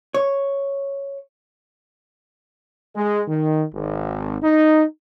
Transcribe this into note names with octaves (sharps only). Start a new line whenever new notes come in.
C#5
G#3
D#3
G#1
D#4